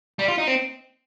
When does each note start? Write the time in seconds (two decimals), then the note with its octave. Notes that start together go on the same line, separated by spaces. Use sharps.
0.19 G3
0.28 F4
0.38 D#4
0.47 C4